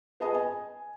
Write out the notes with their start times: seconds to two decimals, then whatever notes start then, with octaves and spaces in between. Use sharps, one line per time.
0.20 B3 G#4 D#5 A5 D#6
0.34 G#5